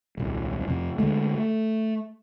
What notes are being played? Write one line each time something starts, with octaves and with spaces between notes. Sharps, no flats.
D#1 C2
F2 C3
D3 D#3 G#3 A3
A3